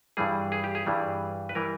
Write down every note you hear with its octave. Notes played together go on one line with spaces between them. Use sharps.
G2 E3 G3 G#4
G#4
G4
G#4
G2 E3 G3
B4
E3 G3 A#4